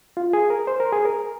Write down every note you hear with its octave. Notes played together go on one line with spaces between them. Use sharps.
F4
G#4
A#4
C5
A#4
G#4
A#4